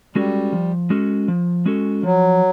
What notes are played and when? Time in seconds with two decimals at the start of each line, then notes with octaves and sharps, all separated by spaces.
0.15 G3 G#3 C#4 F#4 A4
0.53 F3
0.90 G#3 C#4 F#4 A4
1.28 F3
1.66 G#3 C#4 F#4 A4
2.03 F3 F#3